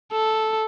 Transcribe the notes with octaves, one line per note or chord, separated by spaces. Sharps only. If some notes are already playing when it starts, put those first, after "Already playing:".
A4